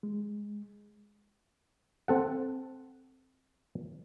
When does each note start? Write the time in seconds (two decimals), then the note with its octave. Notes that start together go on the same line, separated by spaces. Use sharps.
0.03 G#3
2.08 C4 A4 F#5